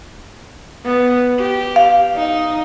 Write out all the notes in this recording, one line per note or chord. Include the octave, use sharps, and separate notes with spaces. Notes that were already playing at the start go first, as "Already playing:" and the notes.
B3
G4
F5
D#4